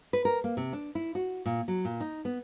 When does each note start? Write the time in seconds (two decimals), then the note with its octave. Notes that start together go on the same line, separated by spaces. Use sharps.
0.13 B4
0.25 A#4
0.44 A#3
0.57 C3
0.73 D4
0.95 E4
1.15 F#4
1.46 A#2
1.68 F#3
1.85 A#2
2.00 D#4
2.25 B3